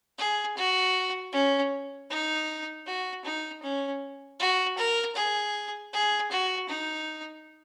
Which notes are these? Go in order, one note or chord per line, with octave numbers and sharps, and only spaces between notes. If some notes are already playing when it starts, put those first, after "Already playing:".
G#4
F#4
C#4
D#4
F#4
D#4
C#4
F#4
A#4
G#4
G#4
F#4
D#4